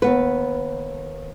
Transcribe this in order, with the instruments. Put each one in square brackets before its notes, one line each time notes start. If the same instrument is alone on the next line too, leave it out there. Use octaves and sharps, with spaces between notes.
[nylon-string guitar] D#2 B3 B4